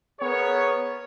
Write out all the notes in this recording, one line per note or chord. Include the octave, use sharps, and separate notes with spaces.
B3 G#4 A#4 C#5